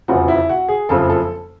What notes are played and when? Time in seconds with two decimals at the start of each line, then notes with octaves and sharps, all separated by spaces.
0.08 F1 E2 C#3 F3 F#4
0.28 E4
0.49 F#4
0.69 G#4
0.89 F#1 F2 C#3 F3 A4
1.10 A4